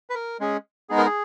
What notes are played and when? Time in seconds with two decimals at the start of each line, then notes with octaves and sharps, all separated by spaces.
0.10 B4
0.15 A#4
0.40 G#3 C#4 G#4
0.89 G#3 B3 D#4 G#4
0.98 A#4
1.06 G#4